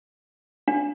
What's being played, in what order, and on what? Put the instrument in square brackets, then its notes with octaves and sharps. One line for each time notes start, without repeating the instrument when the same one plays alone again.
[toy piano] D4